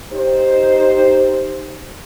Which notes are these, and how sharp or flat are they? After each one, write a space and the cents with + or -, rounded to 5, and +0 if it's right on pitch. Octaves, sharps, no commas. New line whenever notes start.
D#4 +0 G4 +0 C5 +0